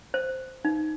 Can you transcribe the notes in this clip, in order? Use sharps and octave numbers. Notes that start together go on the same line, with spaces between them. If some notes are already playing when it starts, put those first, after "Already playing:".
C5
D#4